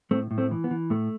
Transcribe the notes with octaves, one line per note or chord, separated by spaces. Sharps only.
A2 A3 C4
A2
A3 C4
E3
B3
E3
A2 A3